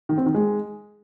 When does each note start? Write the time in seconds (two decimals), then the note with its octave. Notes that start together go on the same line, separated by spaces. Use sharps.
0.09 D#3
0.18 C4
0.26 D#3
0.34 G#3